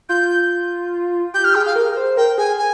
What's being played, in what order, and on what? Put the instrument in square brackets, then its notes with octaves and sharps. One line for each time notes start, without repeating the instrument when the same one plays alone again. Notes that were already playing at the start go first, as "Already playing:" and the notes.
[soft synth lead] F4 [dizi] G6
[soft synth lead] G4 [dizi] G6
[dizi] F6
[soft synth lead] G#4 [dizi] G5
[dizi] F5
[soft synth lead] A#4
C5
[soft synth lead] A#4 [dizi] G5
[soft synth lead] G#4 [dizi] G#5
[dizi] G#5